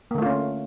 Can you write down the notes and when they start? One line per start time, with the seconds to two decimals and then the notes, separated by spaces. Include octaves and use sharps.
0.11 A#3
0.15 D3
0.18 A3
0.22 F4
0.26 C#4